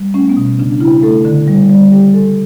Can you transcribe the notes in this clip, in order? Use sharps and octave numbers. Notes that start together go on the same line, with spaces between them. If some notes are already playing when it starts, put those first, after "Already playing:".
Already playing: G3
A3 C#4
B3
B2
C#3 D4
C#3 E4
A3 A4
D3
G3
G3
G3 G4
G3 A4